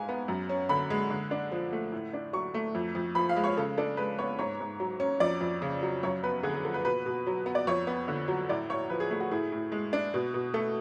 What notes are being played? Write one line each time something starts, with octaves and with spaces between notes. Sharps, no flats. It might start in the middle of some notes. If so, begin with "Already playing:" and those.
Already playing: G#2 G#3 F5 G#5
B3
F#2
C#4
D3 B5
G#3
D3
D4
F3
A3
A2
D4
F#3 C#6
A3
F2
F2
F3 B5
F5
G#3
C#5
C#3 A4
D4 A4
G#3 B4
B3 C#5
G#2 C#5
G#2
F#3
C#4
F2 D5
F2
C#3
F#3
F#2 C#5
B3 B4
D3 G#4
G#4
F3 A4
B4
B2 B4
B2
F#3
B3
D5
F2 C#5
B3
D3
F#3
A2 D5
A2 C#5
F3 B4
G#4
A3 G#4
F#4
A2 G#4
A2
G#3
D4
B2
B2
A3 A4